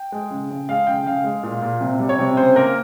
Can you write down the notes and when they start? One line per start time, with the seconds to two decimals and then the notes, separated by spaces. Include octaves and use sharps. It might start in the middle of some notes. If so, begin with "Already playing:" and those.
Already playing: G5
0.12 G#3
0.30 C#3
0.50 C#3
0.69 G#3 F5
0.87 C#3 G5
1.06 C#3 F5
1.24 G#3
1.43 A#2
1.62 A#2
1.81 C3
2.00 G3
2.09 C#5
2.19 C3
2.37 C#3 C5
2.56 A#3 A#4